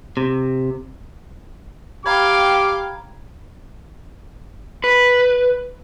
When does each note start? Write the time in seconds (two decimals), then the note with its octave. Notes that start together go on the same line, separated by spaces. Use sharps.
0.17 C3
2.06 G4 F5 G5 A#5 B5 D6 G#6
4.84 B4